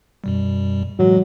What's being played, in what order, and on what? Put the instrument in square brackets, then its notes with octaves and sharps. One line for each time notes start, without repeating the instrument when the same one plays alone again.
[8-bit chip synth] F#2 B2 G3
[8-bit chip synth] A2 E3 G#3 [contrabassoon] F#3